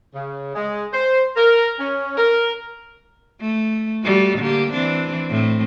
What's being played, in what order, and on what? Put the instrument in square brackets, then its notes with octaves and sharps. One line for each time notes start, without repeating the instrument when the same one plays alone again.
[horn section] C#3
G#3
C5
A#4
C#4
A#4
[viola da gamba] A3
G3 A3 F#4
D3 A#3 G4
E3 C4 D4
A2 A3 C4